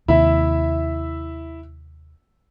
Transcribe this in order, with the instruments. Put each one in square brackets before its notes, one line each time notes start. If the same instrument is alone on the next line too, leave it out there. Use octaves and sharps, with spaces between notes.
[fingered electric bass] D#2 C3 [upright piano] E4 E5